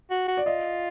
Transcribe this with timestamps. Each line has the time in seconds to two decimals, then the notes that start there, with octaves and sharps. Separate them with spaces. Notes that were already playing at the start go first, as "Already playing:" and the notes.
0.11 F#4
0.28 F#4
0.37 D5
0.46 F4 D#5